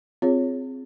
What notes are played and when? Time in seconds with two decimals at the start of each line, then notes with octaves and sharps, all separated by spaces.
0.22 C4 F4 G#4 C#5